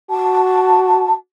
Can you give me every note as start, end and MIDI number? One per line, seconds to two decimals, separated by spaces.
0.10 1.15 66
0.10 1.12 81